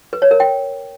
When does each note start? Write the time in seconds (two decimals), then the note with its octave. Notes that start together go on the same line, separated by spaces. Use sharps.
0.13 B4
0.22 C#5
0.31 A#4
0.40 G5